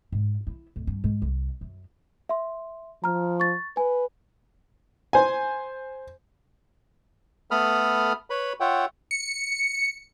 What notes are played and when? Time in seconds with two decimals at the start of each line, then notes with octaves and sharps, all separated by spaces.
0.12 G#2
0.47 E4
0.76 D1
0.87 G2
1.04 G#2
1.22 C2
1.61 F#2
2.29 E5 C6
3.04 F3 A#5 F6
3.40 C#6 A6
3.77 B4 G#5
5.13 C5 G#5
7.51 A3 B3 A4 B5 D#6 F6
8.30 B4 C#5 B5
8.60 F4 C#5 E5 F#5 G5
9.11 C#7